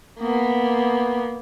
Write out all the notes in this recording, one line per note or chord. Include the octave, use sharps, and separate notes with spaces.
A#3 B3